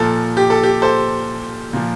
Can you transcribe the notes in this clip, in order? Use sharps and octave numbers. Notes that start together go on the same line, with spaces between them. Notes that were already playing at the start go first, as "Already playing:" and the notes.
Already playing: A#2 F3 A4
G4
A4
G4
A4 C5
A#2 F3